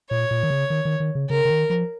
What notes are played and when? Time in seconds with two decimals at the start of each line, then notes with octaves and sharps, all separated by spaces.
0.10 A#2 C#5
0.31 A#2
0.43 D#3
0.50 C#3
0.70 D#3
0.85 D#3
1.00 D#3
1.15 C#3
1.30 C#3 A#4
1.45 C#3
1.50 D#3
1.70 F3